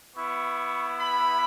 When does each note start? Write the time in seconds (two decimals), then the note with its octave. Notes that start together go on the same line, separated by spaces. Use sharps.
0.15 B3 E4 C#6
1.00 B5